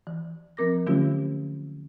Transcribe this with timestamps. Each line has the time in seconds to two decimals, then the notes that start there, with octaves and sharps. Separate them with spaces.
0.07 E3
0.57 F3 C4 A#4 D6 A#6
0.87 D3 F#3 A3 C#4 F4 G4